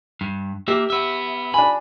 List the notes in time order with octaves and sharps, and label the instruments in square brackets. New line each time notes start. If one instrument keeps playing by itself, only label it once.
[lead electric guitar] G2
[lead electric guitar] A#3 E5 [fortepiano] G4
[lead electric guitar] B3 E5
[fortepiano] D4 G#5 [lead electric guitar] B5